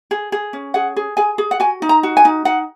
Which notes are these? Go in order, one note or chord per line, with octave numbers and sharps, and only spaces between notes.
G#4
G#4
C#4
G#4 F#5
G#4
G#4 G#5
G#4
F#5
F#4 G#5
D#4
A#5
F#4
G#5
D#4
D#4 F#5